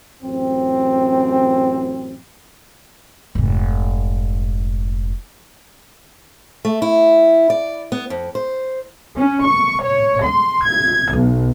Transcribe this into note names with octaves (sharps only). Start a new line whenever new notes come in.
A1 F#2 C4
F1 G#2
A3
E4
D5
B3
F2
C5
C#4
C#6
C#5
C6
G#6
B1